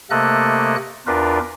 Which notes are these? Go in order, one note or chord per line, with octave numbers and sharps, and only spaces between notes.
C3 A3 A#3 A4 D#5 F#6
E2 D4 F4 A#4 B4